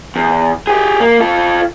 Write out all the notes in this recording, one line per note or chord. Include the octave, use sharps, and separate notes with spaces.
E2
G4 G#4
A#3
F4 A4